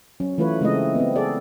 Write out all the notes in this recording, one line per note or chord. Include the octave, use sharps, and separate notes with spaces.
F#3 C#4
E3 A3 F4 B4 C#5
C#3 G#3 A3 C4 E4 D#5
B3 C4
G#4 A4 D5